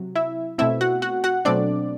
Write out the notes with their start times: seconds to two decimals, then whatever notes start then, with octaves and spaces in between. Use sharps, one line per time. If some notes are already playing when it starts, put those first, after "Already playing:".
Already playing: C3 F#3
0.15 E4 E5
0.58 B2 A3 C4 E4 E5
0.81 F#4 F#5
1.02 F#4 F#5
1.24 F#4 F#5
1.45 B2 F#3 A3 C4 D4 D5